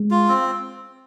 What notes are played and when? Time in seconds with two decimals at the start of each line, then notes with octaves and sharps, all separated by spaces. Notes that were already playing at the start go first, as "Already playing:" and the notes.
Already playing: G#3
0.11 F4
0.28 C4